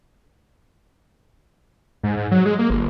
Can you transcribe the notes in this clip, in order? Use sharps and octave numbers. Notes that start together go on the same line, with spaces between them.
G#2
G#2
F#3
G#3
A#3
G1